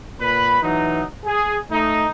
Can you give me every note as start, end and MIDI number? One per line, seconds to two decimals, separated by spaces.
0.20 0.60 46
0.20 0.60 71
0.20 0.60 83
0.62 1.01 52
0.62 1.01 54
0.62 1.01 57
0.62 1.01 63
1.24 1.55 68
1.71 2.07 57
1.71 2.07 63